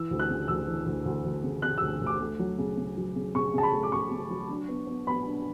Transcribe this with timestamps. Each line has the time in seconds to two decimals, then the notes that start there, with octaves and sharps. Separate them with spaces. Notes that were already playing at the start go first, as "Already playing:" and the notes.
Already playing: E3 E6
0.11 D2
0.19 F#6
0.29 C#3
0.48 D2 E6
0.68 E3
0.86 D2
1.06 D2
1.24 D2
1.43 C#3
1.62 C#3 F#6
1.78 D2 E6
2.01 D2
2.06 D6
2.20 A3
2.39 F#3
2.58 C#3
2.77 C#3
2.97 F#3
3.16 C#3
3.35 C#3 C#6
3.53 C#3 A5
3.63 B5
3.73 A3
3.83 D6
3.92 C#3 C#6
4.11 C#3
4.30 F#3
4.49 D4
4.69 B3
4.87 B3
5.07 B3 B5
5.26 D4